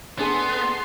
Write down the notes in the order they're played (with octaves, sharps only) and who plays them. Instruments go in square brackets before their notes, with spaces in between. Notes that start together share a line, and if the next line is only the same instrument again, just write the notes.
[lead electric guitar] B3 [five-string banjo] D4 G#4 A4 [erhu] C6